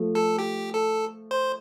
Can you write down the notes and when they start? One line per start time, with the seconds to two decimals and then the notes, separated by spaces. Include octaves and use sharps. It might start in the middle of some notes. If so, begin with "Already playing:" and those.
Already playing: F3 A3
0.15 A4
0.39 G4
0.74 A4
1.31 C5